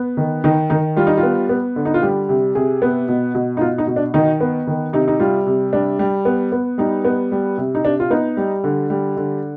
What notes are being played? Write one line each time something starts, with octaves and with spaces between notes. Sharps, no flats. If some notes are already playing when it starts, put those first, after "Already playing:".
Already playing: B3
D#3
D#3 D#4
D#3 D#4
G3 F4
D#4
F4
B3
B3
D3
D#4
F4
G3 G4
C3
C3 G#4
B3
B2
B2
D#4
B2 F4
D#4
B2
D4
D#3 D#4
B3
D#3
C3 D#4
D#4
G3 F4
C3
G3 D4
G3
B3
B3
G3 D#4
B3
G3
C3
D#4
C3 D4
F4
B3 D#4
G3
D3
G3
D3